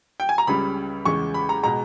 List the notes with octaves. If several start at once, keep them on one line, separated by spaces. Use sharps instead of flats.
G5
G#5
A#5
C#2 C#3 G3 B5
E2 C#3 G#3 C#6
B5
A#5
B2 G#3 A#5